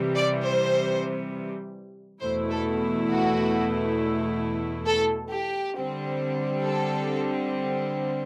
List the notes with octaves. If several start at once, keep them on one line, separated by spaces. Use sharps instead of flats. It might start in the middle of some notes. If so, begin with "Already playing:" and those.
Already playing: C3 E3 G3
D5
C5
E2 B2 A3 E4 C5
A4
F#4
A4
G4
D3 G3 C4
A4